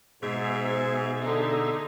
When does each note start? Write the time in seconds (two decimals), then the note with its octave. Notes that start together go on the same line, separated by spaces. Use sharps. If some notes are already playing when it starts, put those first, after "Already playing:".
0.23 G#2 B2 G#4 E5
1.22 D3 D#4